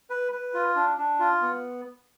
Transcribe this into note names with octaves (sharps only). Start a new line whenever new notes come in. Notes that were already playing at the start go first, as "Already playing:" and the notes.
B4
B4
F4
D4
D4
F4
B3